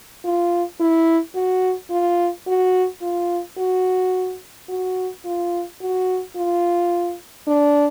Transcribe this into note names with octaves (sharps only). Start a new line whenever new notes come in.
F4
E4
F#4
F4
F#4
F4
F#4
F#4
F4
F#4
F4
D4